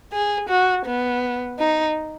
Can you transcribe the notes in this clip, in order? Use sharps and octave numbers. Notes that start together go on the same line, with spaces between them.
G#4
F#4
B3
D#4